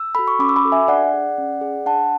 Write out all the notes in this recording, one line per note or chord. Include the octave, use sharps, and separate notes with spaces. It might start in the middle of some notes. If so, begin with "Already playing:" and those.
Already playing: E6
F#4 A4 B5
C#6
C#4 B5 D6
E6
B5 D6
F#4 A4
E5 G#5
D4 D5 F#5
G#4
C#4
G#4
D4 F#5 A5